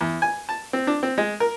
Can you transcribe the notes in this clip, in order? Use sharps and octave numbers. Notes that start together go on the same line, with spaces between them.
E2
G#5
A5
C4
D4
C4
G#3
A#4